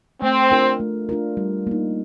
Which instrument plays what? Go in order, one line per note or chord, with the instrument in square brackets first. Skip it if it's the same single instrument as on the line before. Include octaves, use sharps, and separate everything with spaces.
[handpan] A3 [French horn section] C4
[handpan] D4 F4 A#4
A3
D4 F4 A#4
G3
A#3 D#4